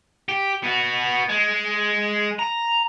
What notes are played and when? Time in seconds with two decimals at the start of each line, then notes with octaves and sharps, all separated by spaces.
0.29 G4
0.63 B3 F#4
1.29 G#3
2.39 A#5